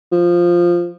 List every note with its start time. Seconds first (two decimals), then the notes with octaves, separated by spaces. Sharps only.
0.12 F3